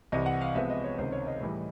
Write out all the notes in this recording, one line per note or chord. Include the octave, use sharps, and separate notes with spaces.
C2 C3 E3 D#5
F#5
F5
C3 F3 G#3 B3 E5
D#5
C#5
C#2 C3 D#3 C5
C#5
D#5
A2 E3 G3